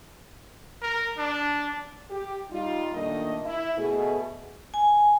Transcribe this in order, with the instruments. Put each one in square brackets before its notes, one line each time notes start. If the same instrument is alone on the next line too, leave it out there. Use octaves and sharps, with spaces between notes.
[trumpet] A#4
D4
[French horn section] G4
G3 D#4 F4
A#2 D#3 A3 A#3 D4 D#5
E4
B2 A3 G#4
[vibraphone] G#5